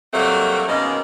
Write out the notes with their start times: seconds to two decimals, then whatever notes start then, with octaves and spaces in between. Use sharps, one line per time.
0.13 F#3 G3 A3 A#3 C4
0.67 B2 D#3 G#3 A#3 C#4